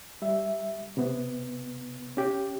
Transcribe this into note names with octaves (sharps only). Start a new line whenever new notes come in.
G3 E5
C3 B3
C#4 G4